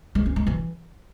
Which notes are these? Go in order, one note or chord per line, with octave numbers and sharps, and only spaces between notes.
G#3
C#4
G#3
E3